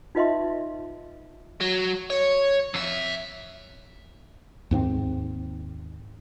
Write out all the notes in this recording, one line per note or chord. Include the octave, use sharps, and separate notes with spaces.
D#4 F4 B4 D#5 E5 C6
F#3
C#5
F2 E5
D#2 G#2 B3 C4